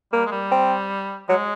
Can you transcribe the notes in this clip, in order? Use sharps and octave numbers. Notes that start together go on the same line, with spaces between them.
G3 A#3
G#3
G3
C4
F#3 G#3